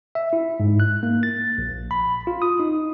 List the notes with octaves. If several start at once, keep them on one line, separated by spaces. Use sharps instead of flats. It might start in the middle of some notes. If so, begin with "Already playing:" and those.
E5
E4
G#2
F#6
A#3
A6
A#1
B5
F4
D#6
D#4